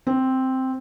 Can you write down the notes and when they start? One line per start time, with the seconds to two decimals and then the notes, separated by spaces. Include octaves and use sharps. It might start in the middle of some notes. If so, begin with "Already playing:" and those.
0.07 C4